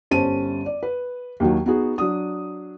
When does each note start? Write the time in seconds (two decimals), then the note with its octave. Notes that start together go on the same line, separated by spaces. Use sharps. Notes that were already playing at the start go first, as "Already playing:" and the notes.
0.11 G1 G3 C#4 C5 A5 D#7
0.66 D5
0.83 B4
1.40 D#2 D#3 F#3
1.66 B3 D#4 F#4 G#4
1.98 F#3 D4 D#6